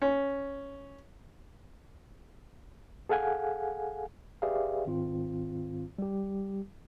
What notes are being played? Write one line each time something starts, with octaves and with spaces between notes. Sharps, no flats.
C#4
G#4 A4 F5 F#5 G#5
G4 G#4 B4 D5 E5 F5
G#2 D#3 C4 F4
G3 G4